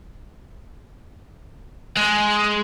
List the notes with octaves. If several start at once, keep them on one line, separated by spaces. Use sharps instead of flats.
G#3